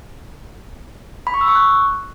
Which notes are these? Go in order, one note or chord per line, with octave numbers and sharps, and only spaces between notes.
B5
C#6
E6
C#6
F#6